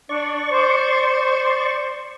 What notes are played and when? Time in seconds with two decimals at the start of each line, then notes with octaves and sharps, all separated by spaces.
0.09 D4 D5 C#6
0.50 C5